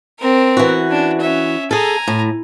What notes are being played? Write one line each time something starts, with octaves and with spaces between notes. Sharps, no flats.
C4 A#4
E3 F#4
C#4 D4
C#4 E5
G#4 A4 G#5 A#5
A2